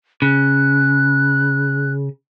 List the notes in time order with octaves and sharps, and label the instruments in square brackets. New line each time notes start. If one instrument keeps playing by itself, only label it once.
[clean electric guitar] C#3 [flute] F#6